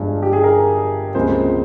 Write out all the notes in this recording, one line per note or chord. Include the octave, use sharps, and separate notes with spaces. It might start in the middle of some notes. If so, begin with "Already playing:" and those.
Already playing: G1 G2 F3 G#3 G#4
G4
G#4
A#4
C#2 C3 F3 A#3 C5